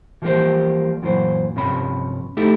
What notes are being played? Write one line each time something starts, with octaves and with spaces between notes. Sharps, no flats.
E3 F3 G3 A#3 G4 C5
F#2 A#2 E3 F#3 C5
C2 G2 C3 F3 C#4 B5
A3 D#4 E4 G4 A4